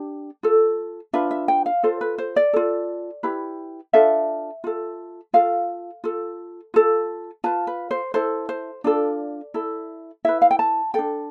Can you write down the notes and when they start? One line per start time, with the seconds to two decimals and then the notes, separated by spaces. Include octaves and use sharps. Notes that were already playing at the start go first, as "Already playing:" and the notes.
Already playing: D4 G4
0.43 F4 A4
1.13 D4 F4 B4 E5
1.31 E5
1.48 G5
1.66 F5
1.83 F4 A4 C5
2.01 B4
2.18 C5
2.36 D5
2.53 F4 A4
3.23 E4 G4 B4
3.93 D4 F4 A4 E5
4.64 F4 A4
5.34 F4 A4 F5
6.04 F4 A4
6.74 F4 A4
7.44 F4 B4 A5
7.67 B4
7.91 C5
8.14 E4 A4 C5
8.49 C5
8.84 D4 F4 A4 D5
9.54 E4 A4
10.25 E4 B4 E5
10.42 F5
10.51 G5
10.59 A5
10.94 D4 A4 G5